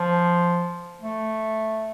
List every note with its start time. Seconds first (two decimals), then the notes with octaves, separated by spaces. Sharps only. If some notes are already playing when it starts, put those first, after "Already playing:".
Already playing: F3
1.02 A3